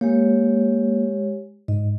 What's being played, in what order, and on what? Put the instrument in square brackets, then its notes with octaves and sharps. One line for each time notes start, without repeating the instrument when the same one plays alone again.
[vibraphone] G#3 G4 C#5 [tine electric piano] A#3
[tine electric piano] G#2 [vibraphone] D#5